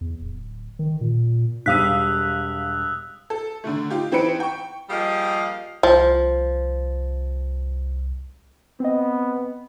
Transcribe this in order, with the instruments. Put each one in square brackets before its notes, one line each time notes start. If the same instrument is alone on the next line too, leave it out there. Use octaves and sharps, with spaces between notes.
[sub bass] E2
D1
D#3
A#2
[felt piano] E1 G3 D#7 [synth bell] F5 B6 [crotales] D#6 E6 F#6
[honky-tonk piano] A4
D3 D#3 A3
D#4 F4 G4
E3 C4 D#4 B4 C#7 D7
G5 C#6
[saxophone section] F3 G3 A#3 G#4 D#5 F5
[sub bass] C2 [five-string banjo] F3
[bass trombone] B3 [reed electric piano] C4 D#5